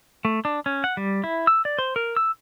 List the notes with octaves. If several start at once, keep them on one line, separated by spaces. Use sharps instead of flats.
A3
D4
C#4
F#5
G3
E4
E6
D5
C5
A#4
E6